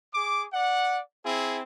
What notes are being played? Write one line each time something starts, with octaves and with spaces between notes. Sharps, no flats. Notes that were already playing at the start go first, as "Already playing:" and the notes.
G#4 D6
D5 F#5
C4 E4 G#4